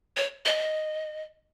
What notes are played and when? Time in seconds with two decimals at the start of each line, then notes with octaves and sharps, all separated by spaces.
0.17 C#5
0.45 D#5